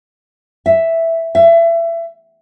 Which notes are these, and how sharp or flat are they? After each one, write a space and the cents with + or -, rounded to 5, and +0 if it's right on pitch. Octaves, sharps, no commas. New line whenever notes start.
E5 +0
E5 +25